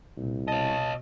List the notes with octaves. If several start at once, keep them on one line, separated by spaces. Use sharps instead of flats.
C2 A#2
B2 C#5 D#5 A5